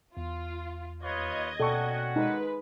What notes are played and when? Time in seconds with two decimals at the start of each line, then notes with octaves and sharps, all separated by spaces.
0.17 E2 F4
1.03 D#2 F4 B4 C#5 D#5 G#6
1.60 B2 C#4 F#4 A4 D5 F#5 G5 C#6
2.16 G#3 D#4 B4